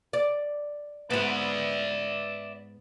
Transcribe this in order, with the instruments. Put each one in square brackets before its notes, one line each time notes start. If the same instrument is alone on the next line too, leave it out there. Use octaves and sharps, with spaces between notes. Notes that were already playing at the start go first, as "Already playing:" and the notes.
[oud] D5
[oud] G#2 B3 [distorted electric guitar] D5 E5